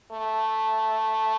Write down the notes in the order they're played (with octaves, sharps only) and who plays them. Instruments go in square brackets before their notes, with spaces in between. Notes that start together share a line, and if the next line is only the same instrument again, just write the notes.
[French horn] A3